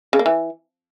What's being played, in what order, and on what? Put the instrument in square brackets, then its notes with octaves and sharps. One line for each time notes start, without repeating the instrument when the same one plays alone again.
[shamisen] C#3
A#3
E3